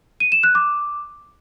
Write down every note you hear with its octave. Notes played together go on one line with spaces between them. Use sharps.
D#7
E7
F#6
D6